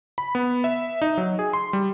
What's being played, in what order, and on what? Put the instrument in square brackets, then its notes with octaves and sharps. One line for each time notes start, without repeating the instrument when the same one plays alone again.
[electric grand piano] B5
B3
E5
D#4
F#3
G#4
C6
G3